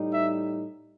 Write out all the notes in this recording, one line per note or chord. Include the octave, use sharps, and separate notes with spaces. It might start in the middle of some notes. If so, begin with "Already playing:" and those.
Already playing: A2 G3 D#4
E5